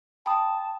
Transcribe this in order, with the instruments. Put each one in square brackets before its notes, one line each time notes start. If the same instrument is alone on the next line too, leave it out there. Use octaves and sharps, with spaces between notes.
[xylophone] G5 B5 D#6 [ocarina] A5